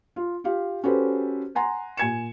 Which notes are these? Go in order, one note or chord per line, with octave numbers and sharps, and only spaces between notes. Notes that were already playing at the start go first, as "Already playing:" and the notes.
F4
F4 G4 F5
C#4 F#4 G4 A4 B4 C5
F#5 G#5 A#5 C6
A#2 G#5 G#6 C#7 E7